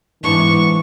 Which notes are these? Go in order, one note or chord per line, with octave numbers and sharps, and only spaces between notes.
G#2 E3 B3 D4 C#6